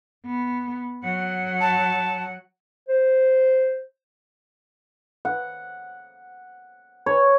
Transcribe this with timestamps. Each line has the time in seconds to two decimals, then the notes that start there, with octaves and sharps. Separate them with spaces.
0.25 B3
1.04 F#3 F#5
1.60 A5
2.88 C5
5.25 F#5
7.06 C#5